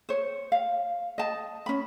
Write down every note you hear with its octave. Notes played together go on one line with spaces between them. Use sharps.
C5 C#5
F5
D#5 A5
C#4 B5